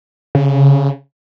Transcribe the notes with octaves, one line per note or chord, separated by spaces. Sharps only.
C#3